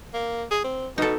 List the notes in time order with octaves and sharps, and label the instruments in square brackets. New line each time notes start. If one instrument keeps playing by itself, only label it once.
[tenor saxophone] A#3
G#4
C4
[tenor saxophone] B2 [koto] D#4 A4